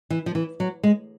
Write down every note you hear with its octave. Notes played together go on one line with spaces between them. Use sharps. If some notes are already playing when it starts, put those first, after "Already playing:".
E3
F3
E3
F#3
G#3